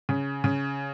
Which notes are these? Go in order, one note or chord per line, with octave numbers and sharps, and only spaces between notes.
C#3
C#3